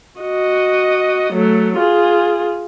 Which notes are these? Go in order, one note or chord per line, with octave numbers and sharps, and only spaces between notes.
F#4 D#5
F#3 A3
F4 G#4